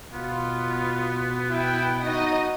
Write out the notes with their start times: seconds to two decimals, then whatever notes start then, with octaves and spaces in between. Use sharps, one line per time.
0.13 B2 B3 F4
1.51 E4 G5
2.03 D#4 F#4 D#5